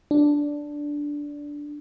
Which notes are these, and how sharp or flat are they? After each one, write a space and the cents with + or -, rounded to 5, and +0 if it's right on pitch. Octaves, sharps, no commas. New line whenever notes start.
D4 -10